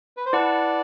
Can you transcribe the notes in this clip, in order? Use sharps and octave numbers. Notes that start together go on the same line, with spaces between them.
B4
C5
E4 B4 D5 F#5 A5